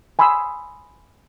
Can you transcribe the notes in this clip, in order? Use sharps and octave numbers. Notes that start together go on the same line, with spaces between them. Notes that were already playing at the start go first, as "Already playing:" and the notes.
G#5 B5 C6 D#6 E6